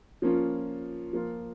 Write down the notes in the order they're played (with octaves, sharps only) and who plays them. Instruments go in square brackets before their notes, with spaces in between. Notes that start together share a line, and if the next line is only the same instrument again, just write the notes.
[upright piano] F3 A#3 C#4 F4
F3 A#3 F4